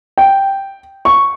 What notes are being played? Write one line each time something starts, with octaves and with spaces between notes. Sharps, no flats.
G5
C#6